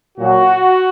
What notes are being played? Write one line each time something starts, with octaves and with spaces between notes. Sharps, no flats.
A#2 F#3 F#4